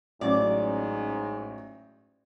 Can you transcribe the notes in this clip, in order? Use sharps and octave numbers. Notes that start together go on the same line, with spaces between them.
A1 G#2 F#3 C#4 D5